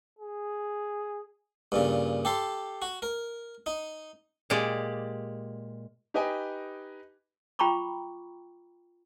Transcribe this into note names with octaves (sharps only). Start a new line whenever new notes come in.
G#4
G2 A#2 C#3
G4 A4 C6
F#4
A#4
D#4
A#2 G#3 G4 D5
D#4 G4 B4 D#5 G5 G#5
F4 G5 A#5 B5 C#6 D6